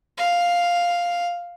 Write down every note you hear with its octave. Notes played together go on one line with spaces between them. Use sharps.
F5